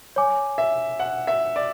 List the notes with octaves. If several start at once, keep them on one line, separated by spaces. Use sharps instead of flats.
C#5 G#5 D6
E5
F#5
E5
D5